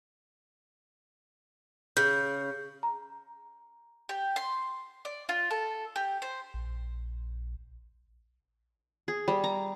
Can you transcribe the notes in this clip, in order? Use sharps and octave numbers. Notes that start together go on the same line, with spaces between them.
C#3 G6
A#5
G4
C6
D5
F4
A4
G4
C5
A#1
G#4
G3
A#5